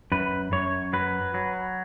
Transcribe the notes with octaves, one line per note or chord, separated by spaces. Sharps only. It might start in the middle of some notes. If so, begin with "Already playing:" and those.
F#2 B4
F#2 C#5
F#3 B4
F#3